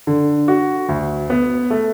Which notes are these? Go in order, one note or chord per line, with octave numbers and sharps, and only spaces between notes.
D3
F#4
D2
B3
A3